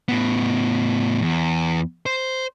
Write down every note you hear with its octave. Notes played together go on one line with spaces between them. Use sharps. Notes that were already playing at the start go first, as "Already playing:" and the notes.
A2 B3
E2
C5